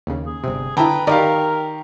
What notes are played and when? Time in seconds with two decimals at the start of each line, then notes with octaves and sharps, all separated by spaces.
0.07 D#2 C#3
0.27 G#4
0.44 G1 C3
0.77 D3 E4 B4 G5 A5 A#5
1.07 D#3 G4 A#4 D5 D#5 F5